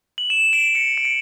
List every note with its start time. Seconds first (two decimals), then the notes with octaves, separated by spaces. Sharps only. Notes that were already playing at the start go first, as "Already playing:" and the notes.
0.18 F#7
0.30 E7
0.53 D7
0.75 C#7
0.98 D7
1.05 C#7